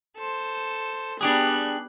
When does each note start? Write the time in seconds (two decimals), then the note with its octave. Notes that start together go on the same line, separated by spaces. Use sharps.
0.18 A4 C5
1.21 G3 B3 D4 G4 G#4 F#6